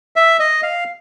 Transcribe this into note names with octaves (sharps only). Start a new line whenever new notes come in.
E5
D#5
F5